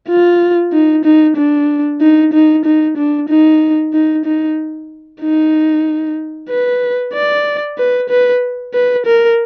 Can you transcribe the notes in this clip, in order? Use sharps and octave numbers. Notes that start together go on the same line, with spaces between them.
F4
D#4
D#4
D4
D#4
D#4
D#4
D4
D#4
D#4
D#4
D#4
B4
D5
B4
B4
B4
A#4